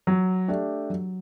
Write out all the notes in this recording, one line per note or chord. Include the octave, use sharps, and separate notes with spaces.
F#3
A3 D4 G4
F#3